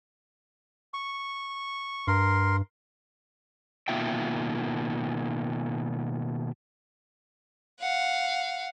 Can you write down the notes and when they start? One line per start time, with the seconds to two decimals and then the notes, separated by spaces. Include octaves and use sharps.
0.94 C#6
2.07 G2 A#4 C6
3.88 B2 D#3 A#3 F4 E5 G5
7.80 F5 F#5